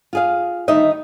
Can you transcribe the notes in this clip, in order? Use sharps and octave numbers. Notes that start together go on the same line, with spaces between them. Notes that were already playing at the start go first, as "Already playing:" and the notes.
F4 G#4 F5
D2 D#3 G3 D#4 D#5 E5